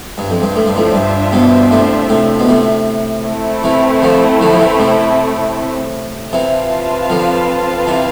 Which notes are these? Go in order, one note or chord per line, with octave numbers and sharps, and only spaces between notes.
G2 D4 F4 C5 E5
F2
G2
A2
G2
F2 A2
G2
G2 B2
A2 C3
A2 C3
B2
A2 C3
A3 C4 E4
C3 E3
D3 F3
D3 F3
F3
C3 E3
A2 C3
C3 E3 C4 F4 B4 F5 A5
D3 F3
C3 E3